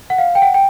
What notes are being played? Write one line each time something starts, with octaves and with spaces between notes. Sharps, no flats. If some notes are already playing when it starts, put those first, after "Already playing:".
F#5
F5
G5
F#5
G5